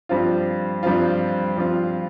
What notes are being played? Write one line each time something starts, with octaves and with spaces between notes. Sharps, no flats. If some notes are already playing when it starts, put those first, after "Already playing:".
G2 F3 C4 F4
G2 F3 C4 F4
G2 F3 C4 F4